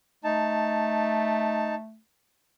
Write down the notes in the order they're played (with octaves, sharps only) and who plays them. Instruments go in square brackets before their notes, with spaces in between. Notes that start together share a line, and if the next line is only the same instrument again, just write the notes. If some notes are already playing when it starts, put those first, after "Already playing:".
[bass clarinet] A3 [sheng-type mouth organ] D#4 A5